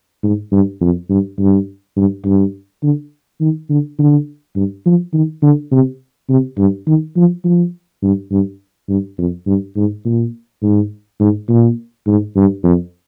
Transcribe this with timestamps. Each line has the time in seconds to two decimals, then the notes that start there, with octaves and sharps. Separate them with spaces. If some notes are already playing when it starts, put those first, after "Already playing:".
0.23 G#2
0.52 G2
0.81 F2
1.09 G2
1.39 G2
1.97 G2
2.25 G2
2.83 D3
3.40 D#3
3.69 D3
3.99 D3
4.56 G2
4.86 F3
5.13 D#3
5.42 D3
5.72 C3
6.29 C3
6.58 G2
6.87 D#3
7.16 F3
7.44 F3
8.03 G2
8.31 G2
8.89 G2
9.18 F2
9.47 G2
9.76 G#2
10.05 A#2
10.62 G#2
11.20 G#2
11.49 A#2
12.07 G#2
12.36 G2
12.64 F2